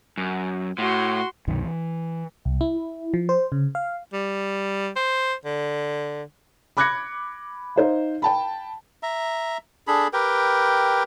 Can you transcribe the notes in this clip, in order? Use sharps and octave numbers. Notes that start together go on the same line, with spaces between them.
F#2
A2 F#4 C6
C2 F#2 B2 D#3
E3
C2
E4
F3
C5
C#3
F5
G3
C5
D3
B5 D6 F#6 G#6 A#6 C#7
D#4 C5 F5
G5 A5 B5
E5 A#5
D4 G#4 A4 B5
G4 A#4 B4 G5